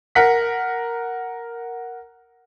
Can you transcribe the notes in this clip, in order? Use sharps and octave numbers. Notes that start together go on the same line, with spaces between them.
A#4 F#5 B6